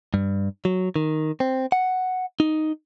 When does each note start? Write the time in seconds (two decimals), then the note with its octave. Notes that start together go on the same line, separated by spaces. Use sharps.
0.14 G2
0.65 F#3
0.96 D#3
1.40 C4
1.72 F#5
2.40 D#4